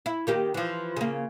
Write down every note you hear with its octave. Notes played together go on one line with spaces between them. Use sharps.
E4
D#3 A#3 G4
E3 F3
C#3 A#3